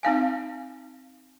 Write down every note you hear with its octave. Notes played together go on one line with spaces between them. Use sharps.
C4 D#4 F5 G#5